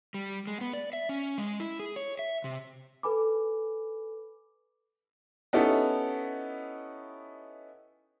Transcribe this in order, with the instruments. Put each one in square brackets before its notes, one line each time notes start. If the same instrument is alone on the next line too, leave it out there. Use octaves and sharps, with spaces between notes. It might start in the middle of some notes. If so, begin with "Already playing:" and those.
[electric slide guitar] G3
G#3
B3
D5
E5
C#4
G#3
E4
G#4
C#5
E5
C3
[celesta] A4 B4 G#5 B5 D6
[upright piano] B3 C#4 D#4 E4 G4 A4